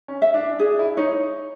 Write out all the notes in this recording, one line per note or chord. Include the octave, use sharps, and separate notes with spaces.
C#4
E5
D4
D4 G#4
E4
D#4 C#5